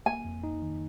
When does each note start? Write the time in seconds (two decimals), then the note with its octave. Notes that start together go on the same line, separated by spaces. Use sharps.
0.06 A#3 G#5
0.25 F2
0.44 D#4
0.62 D#3